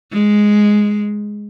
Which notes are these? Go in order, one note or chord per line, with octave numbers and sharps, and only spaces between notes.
G#3